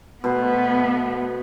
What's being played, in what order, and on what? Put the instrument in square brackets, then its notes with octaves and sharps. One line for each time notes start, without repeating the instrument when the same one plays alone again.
[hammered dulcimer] B2 C5 [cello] A3 B3